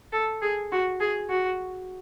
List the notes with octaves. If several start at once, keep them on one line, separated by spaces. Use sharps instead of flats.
A4
G#4
F#4
G#4
F#4